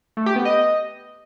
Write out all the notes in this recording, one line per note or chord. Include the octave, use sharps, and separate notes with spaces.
A3
G4
B3
D#5